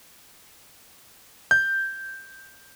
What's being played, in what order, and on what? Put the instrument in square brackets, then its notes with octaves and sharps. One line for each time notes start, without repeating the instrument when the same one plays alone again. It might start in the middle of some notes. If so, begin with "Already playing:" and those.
[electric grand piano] G6